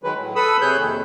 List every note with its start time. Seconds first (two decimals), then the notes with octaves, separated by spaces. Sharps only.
0.04 D#3 F#3 G#3 B4
0.18 A2 F#3
0.36 A4 B4 B5 D#6 E6
0.61 C3 G#4 C#5 F#6 G6
0.78 F2 A#2 D#3